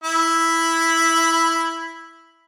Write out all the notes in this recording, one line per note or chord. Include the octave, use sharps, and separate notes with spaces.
E4 B5